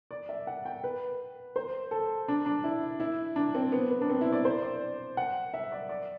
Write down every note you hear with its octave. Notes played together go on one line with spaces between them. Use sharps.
D5
E5
F#5
G5
B4
C5
A4
D4
D4
E4
E4
D4
C4
B3
B3
D4
C4
E4
D5
C5
D5
F#5
E5
D5
D5